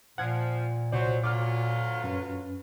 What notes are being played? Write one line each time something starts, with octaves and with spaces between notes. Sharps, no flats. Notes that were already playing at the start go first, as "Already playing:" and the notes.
A#2 F3 F#5 G#6
C2 C3 F#3 C5 D5
D2 F#3 F4 D6 F6
F#2 C#4 B4